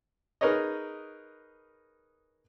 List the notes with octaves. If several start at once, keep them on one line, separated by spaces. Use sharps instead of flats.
D#4 G#4 A#4 B4 C#5 D#5